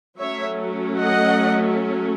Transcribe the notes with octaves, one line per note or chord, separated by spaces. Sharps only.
F#3 A3 C#4 C#5 E5
D#5 F#5